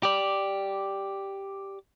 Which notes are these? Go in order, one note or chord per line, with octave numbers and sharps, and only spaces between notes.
G4 D5